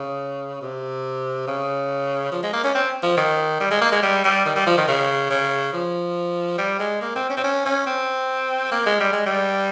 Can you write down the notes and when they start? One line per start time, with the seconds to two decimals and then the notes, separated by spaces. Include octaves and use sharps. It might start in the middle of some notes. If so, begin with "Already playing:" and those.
Already playing: C#3
0.62 C3
1.47 C#3
2.32 F3
2.43 G#3
2.53 A#3
2.64 C#4
2.75 C4
3.03 F3
3.17 D#3
3.60 G3
3.71 G#3
3.81 A#3
3.92 G#3
4.03 G3
4.24 G3
4.46 D#3
4.56 G3
4.67 F3
4.77 D#3
4.88 C#3
5.30 C#3
5.73 F3
6.58 G3
6.80 G#3
7.01 A#3
7.16 C4
7.30 C#4
7.37 C4
7.44 C#4
7.65 C#4
7.86 C4
8.72 A#3
8.86 G#3
9.00 G3
9.13 G#3
9.26 G3